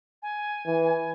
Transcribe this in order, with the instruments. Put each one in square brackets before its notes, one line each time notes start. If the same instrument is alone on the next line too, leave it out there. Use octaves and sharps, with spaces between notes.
[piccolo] G#5
[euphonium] E3